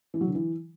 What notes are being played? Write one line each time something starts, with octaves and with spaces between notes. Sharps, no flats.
E3
F#3
D3
E3